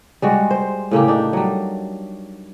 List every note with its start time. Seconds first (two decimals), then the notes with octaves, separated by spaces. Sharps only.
0.22 G3 G#3 F#4
0.51 C5
0.91 A2 C#3 A#3 G4
1.08 D4 D#4
1.33 F#3 G3